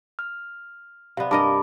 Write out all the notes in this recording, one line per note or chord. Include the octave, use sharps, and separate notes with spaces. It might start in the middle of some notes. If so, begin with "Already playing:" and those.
F6
C3 B3 D5 F5
G2 A#4 D#5 A5 B5 D6